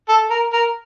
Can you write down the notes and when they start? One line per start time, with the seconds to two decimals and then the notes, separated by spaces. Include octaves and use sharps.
0.08 A4
0.30 A#4
0.52 A#4